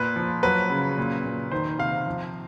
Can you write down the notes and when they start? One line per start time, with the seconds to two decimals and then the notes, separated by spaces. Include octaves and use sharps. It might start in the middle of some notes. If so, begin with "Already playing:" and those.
Already playing: A#2 B4
0.16 F3
0.43 F#3 B4
0.70 C#3
0.98 A#2
1.25 A#2
1.52 D#3 C5
1.79 C3 F5
2.06 F3